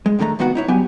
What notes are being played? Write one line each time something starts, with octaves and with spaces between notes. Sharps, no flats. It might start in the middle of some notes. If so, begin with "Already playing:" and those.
G#3
A2 D3 D#3 A3 A#5
C2 D#3 B3 F#4 F#5
D#4 E4 C#5
G2 F#3 B3 G4 G#5